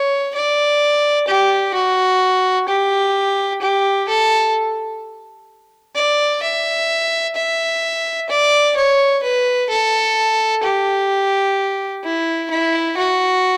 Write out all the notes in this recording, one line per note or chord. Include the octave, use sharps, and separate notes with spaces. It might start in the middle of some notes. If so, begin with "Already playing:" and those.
Already playing: C#5
D5
G4
F#4
G4
G4
A4
D5
E5
E5
D5
C#5
B4
A4
G4
E4
E4
F#4